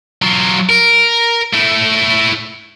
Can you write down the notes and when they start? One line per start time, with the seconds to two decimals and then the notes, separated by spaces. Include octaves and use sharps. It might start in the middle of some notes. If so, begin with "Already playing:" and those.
0.22 F#3 F4
0.70 A#4
1.54 A3 E4